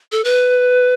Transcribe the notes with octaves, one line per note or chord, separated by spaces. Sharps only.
A4
B4